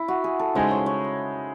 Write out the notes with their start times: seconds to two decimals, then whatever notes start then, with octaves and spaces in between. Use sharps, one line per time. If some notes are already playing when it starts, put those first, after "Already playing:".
Already playing: E4
0.08 F#4
0.24 G#4
0.39 A4
0.54 C#3 G#3 D#4 C5
0.71 C#5
0.86 C#5